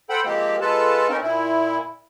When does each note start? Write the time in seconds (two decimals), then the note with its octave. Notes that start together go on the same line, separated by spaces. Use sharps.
0.10 A4 C5 F#5 G5 B5
0.25 F3 G#3 A#3 C4 G4
0.61 G#3 F4 A4 B4 A5
1.09 C4 C#4 D#4 A#4
1.22 A#2 E4